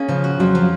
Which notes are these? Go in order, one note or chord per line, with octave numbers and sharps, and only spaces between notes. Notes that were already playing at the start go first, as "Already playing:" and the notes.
Already playing: A#3 C#4 G#4
C#3 F3
F#4
F2 F#3
F3